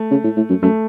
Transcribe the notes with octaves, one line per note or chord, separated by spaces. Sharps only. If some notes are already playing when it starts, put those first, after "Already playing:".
Already playing: A3
C#3
A2
A2
F#2
F#2 A3